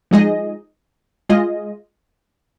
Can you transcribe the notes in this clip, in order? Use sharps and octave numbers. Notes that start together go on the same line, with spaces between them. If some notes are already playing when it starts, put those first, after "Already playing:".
F3 G#3 D#4 G#4 D#5
G#3 F4 G#4 D#5